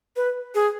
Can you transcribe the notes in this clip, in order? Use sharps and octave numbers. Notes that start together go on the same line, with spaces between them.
B4
G#4